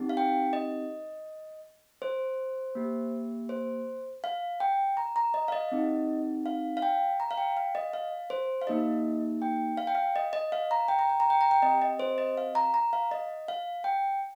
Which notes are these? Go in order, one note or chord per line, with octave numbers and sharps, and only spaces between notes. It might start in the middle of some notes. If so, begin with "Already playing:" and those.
Already playing: C4 D#4 G4
F5
G5
D#5
C5
A#3 G4
C5
F5
G5
A#5
A#5
D#5
F5
D#5
C4 D#4 G4
F5
F5
G5
A#5
F5
G5
F5
D#5
F5
C5
F5
A#3 D#4 G4 D#5
G5
F5
G5
F5
D#5
D#5
F5
A#5
G5
A#5
G5
A#5
G5
A#5
G5
C4 G4 D#5
D#5
C5
D#5
F5
A#5
A#5
F5
D#5
F5
G5